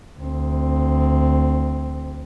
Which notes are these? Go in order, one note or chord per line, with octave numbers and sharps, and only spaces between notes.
D2 C4